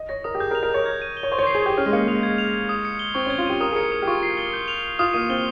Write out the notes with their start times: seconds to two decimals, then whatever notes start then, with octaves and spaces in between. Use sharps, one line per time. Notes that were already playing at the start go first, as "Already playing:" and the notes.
Already playing: D#5
0.09 C#5 A#6
0.24 A#4 D#6
0.35 G4
0.40 G#4 G6
0.51 A#4
0.55 F7
0.63 A#4
0.70 C#5 G6
0.86 G#6
1.02 D#7
1.17 G7
1.23 C#5
1.32 C5 C#6
1.39 C#5
1.43 C5
1.47 C7
1.55 G#4
1.62 G4 C#6
1.77 C#4 F6
1.86 G#3
1.93 A#3 C#7
2.08 G#3 F7
2.23 G#6
2.38 F7
2.53 G#6
2.69 D#6
2.85 C#7
2.99 G7
3.15 C4 C#6
3.26 C#4
3.30 G#6
3.38 F4
3.46 G4 D#7
3.60 A#4 D#6
3.72 G#4
3.76 A#4 C#7
3.92 D#6
4.02 G4
4.07 F4 C#6
4.23 C7
4.37 G7
4.53 G6
4.68 F7
4.84 G6
4.99 F4 D#6
5.13 A#3 D#7
5.29 C4 G7